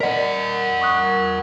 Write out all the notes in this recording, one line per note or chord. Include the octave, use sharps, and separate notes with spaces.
A#4 D5 D#5 F#5 B6
C#6 D#6 F#6